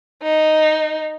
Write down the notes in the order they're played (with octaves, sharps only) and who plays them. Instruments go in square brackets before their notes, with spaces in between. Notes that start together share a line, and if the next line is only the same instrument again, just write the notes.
[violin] D#4